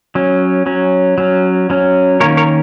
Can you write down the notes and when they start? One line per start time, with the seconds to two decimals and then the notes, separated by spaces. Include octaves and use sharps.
0.15 F#3 C#4
0.66 F#3 C#4
1.18 F#3 C#4
1.70 F#3 C#4
2.20 D#3 A#3 C#4 A#4 C#5
2.37 A#4 C#5